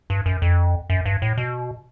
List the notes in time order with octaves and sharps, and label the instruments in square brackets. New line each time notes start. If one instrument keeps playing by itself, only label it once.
[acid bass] G2
F#2
F2
F#2
G2
A2
B2